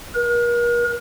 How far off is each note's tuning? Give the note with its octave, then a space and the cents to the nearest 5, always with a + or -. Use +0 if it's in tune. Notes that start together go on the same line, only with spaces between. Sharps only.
A#4 +40